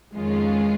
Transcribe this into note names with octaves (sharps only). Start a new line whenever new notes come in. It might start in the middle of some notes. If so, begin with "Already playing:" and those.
F2 D#3 G#3 C#4 F4